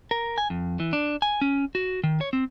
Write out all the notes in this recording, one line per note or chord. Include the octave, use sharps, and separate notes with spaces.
A#4
G#5
F2
E3
D4
G#5
C#4
F#4
D#3
C#5
C4